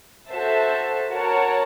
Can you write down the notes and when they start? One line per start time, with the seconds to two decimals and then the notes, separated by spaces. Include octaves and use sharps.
0.29 F#4 A4 C5 E5 A5
1.09 F#4 A#4 C#5 F#5 A5